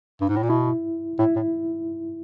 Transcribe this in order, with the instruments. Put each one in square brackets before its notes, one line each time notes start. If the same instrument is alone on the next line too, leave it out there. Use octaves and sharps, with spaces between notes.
[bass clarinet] G2
G#2
A2
A#2
[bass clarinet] B2 [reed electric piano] E4
[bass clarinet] A2 [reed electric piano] E4
[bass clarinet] A2